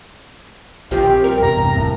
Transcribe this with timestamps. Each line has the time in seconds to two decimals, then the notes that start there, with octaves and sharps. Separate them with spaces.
0.91 A#1 D#3 C4 F4 G4
1.24 G3 A#4
1.42 E2 G2 C3 A#5
1.73 F#1 A2